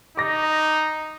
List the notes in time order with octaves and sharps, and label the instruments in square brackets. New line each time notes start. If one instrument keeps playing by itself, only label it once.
[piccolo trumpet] D#4 [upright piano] D6 A#6